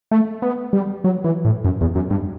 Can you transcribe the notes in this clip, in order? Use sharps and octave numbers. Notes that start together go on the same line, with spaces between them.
A3
B3
G3
F#3
E3
A2
F#2
E2
F#2
G2